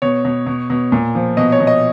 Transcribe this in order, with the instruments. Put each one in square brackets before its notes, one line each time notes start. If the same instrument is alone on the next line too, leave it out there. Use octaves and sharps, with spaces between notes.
[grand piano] B2 C#5
B2
B2
B2
A#2
F3
B2 D#5
C#5
B2
D#5